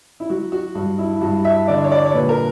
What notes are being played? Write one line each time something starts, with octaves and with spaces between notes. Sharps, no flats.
E4
F#3 F#4
F#4
G2 F#4
E4
G2 F#4
E5
D3 D5
C#5
D5
C#5
A#2 B4
A#4